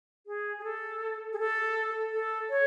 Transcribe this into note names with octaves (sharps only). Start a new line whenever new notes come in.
G#4
G#4
A4
G#4
A4
A4
C#5